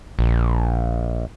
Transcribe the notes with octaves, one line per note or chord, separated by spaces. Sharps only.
A#1